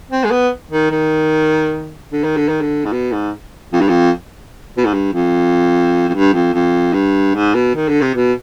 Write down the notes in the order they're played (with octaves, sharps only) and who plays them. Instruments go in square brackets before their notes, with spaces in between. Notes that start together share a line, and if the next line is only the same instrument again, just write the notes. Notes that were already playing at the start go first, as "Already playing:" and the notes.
[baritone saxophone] C4
G#3
B3
D#3
D#3
D3
D#3
D3
D#3
D3
G#2
B2
G#2
F2
G2
F2
B2
G#2
G2
F2
F2
G2
F2
F2
G2
G#2
B2
D#3
D3
C3
B2